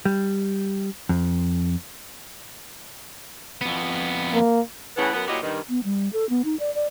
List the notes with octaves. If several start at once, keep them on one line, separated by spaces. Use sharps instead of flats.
G3
F2
F2 B3
A#3
A2 C#3 E3 B3
F#2 B3
A#2 F#3 E4 F#4 G4 D#5
G2 D#3
B3
G3
A4
B3
D#4
D5
D5